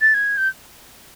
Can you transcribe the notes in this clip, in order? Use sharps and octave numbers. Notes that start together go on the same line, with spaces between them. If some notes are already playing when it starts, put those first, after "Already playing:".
A6
G#6
G6